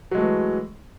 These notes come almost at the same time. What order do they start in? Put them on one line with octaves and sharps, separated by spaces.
F#3 G#3 A3 E3